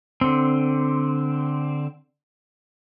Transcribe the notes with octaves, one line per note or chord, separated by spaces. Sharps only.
D3 C4